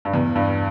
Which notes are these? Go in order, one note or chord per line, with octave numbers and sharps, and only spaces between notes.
G2
E2
G2